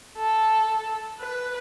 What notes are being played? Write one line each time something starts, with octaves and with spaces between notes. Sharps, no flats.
A4
B4